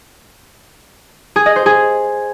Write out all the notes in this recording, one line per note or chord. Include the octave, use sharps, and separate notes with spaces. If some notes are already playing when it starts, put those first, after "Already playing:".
G#4
D#5
C5
G#4